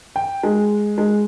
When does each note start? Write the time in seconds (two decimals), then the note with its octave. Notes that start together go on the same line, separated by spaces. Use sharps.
0.16 G5
0.43 G#3
0.98 G#3